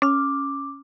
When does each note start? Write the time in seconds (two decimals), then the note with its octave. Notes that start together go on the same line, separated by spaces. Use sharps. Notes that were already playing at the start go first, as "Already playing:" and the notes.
0.02 C#4 D6 F6